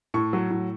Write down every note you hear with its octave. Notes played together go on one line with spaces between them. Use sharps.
A2 C#6
F#3
A2